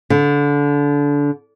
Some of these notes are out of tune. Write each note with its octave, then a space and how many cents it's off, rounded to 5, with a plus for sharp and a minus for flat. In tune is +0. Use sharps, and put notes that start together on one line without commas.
D3 -25